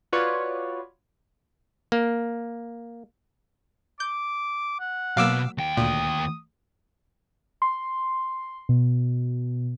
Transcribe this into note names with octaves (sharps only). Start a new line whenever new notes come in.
F4 F#4 B4 C#5 D5
A#3
D6 G6
F#5
B2 F#3 A#3 F5 D6 E6
D#2 G5
D2 A#2 D#6
C6
B2